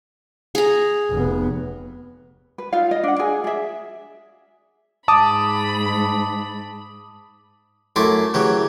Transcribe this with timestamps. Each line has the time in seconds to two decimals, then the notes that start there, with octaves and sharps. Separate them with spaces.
0.55 G#4 A#5
1.10 F1 B3
2.58 B4
2.73 D#4 F4 E5 F5
2.91 D#5
3.03 D4 F#5
3.19 G#4 G#5
3.44 G#4 E5
5.08 G#2 A5 B5 D6 D#6
7.96 F#2 A3 E4 C6 D6
8.34 C#3 E3 F#3 G4